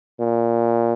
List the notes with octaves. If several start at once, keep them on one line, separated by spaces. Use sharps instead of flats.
A#2